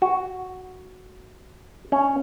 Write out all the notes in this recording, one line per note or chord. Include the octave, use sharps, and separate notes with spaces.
F#4
C#4